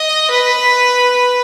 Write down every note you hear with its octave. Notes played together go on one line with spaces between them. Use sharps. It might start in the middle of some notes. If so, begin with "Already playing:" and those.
Already playing: D#5
B4